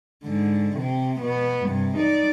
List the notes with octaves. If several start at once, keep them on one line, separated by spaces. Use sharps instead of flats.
G#2 D3
C3 C4
B2 B3
G2 C3
D#4 D5